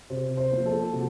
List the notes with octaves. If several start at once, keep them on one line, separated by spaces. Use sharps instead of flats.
C3 C5
C5
F3 A#3
A4
C3 F#4